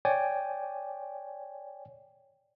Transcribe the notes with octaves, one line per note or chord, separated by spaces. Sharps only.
C#5 D5 G5 G#5